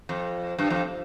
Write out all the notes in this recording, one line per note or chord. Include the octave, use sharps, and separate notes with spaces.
F2
G2
F2